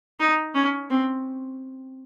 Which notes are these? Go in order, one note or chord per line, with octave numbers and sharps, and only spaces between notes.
D#4
C#4
C4